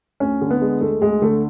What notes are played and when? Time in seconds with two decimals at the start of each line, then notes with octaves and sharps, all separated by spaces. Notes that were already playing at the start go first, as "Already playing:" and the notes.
0.20 D2 C#4
0.42 D3
0.51 B3
0.61 G#3
0.81 D2 A3
1.01 D2 G#3
1.22 D3 A3